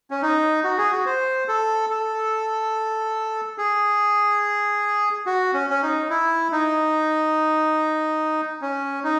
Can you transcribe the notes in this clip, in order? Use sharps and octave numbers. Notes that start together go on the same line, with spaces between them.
C#4
D#4
F#4
G#4
F#4
C5
A4
A4
G#4
F#4
C#4
C#4
D#4
E4
D#4
C#4
D#4